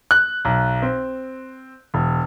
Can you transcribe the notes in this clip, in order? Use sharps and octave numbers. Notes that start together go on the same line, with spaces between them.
F#6
B1
C4
E1